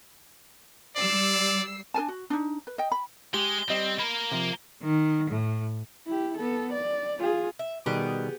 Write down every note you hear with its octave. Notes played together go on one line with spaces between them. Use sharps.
G3 D5 E6 C7
D4 A#4 G#5 A5
F#4
D4 D#4
B4
D#5 G5
B5
G#3 G4 G7
G3 C4 D#5
A#3 A#4 B5
C3 F3
D#3
A2
E4 G4
B3 A4
D5
F4 G#4
E5
B2 D#3 G3 B3 G4 G#4